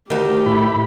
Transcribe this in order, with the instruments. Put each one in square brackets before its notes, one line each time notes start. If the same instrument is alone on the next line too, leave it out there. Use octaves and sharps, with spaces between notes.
[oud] D2 D#3 [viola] G4
[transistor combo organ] A2 E4 B5